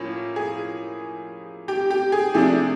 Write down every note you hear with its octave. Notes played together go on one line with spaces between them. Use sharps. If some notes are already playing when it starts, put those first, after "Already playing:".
Already playing: A2 F3 A#3 C#4
G#4
G4
G4
G#4
C3 F3 A3 D4 G#4